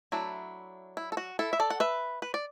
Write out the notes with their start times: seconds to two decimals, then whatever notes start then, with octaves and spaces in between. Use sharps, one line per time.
0.12 F#3 A3 D4 E4
0.97 E4
1.12 A4
1.17 F#4
1.39 E4 A4
1.53 E5
1.60 A4 D5
1.70 F#5
1.80 B4 E5
2.22 B4
2.34 D5